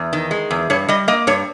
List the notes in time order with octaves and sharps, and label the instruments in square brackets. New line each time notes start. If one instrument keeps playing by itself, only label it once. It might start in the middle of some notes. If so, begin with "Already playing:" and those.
Already playing: [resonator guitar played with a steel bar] E2
D#3
G#3
E2
G2 C#5
G3 D#5
A#3 D#5
G2 C#5